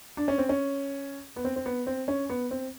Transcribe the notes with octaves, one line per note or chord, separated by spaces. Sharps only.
D4
C#4
C4
C#4
B3
C4
C4
B3
C4
C#4
B3
C4